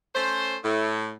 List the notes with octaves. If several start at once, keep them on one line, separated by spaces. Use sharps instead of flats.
A3 C#4 C5
A2